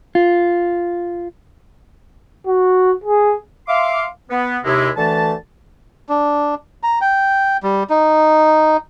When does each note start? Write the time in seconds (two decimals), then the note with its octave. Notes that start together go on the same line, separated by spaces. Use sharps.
0.15 F4
2.47 F#4
3.04 G#4
3.68 E5 F5 C6 D6
4.30 B3
4.64 D#2 C3 G#3 E4
4.97 D2 D3 E3 A3 A5
6.09 D4
6.83 A#5
7.01 G5
7.63 G3
7.90 D#4